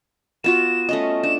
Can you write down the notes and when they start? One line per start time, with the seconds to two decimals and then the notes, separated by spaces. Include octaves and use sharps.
0.44 B3 F4 F#4 E7
0.89 A3 C#4 D#5
1.23 D4 E7